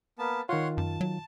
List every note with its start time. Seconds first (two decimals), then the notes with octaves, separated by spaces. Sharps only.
0.19 A#3 B3 A5
0.49 D#3 F4 C#5 F#5 C6
0.78 F#2 A5
1.01 F#3